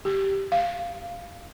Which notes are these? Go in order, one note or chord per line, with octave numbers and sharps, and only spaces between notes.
G4
F5